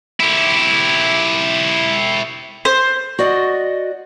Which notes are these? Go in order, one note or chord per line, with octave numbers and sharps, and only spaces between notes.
E4 G4
C5
F#4 D5 D#5 F#5